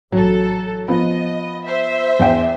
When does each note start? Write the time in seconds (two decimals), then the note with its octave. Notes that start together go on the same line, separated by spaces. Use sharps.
0.12 A1 F#3 A4
0.88 F3 B3 D#5
1.66 C5 E5
2.19 E2 G5